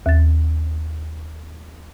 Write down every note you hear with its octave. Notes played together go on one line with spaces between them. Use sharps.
D#2 A6